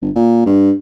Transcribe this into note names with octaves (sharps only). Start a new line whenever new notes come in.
G1
A#2
G2